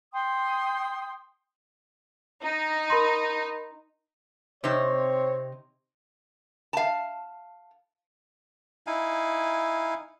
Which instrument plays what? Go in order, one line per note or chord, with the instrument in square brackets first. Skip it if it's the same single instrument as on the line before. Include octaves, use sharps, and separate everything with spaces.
[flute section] G5 C6 D#6
[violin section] D#4
[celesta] A#4 B5 C6
[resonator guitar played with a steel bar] C3 D#4 [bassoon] C4 [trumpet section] C#5
[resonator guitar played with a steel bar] F5 A5
[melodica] D#4 E4 F5 G#5